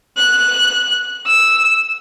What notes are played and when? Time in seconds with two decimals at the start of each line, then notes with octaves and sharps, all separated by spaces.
0.17 F#6
1.26 E6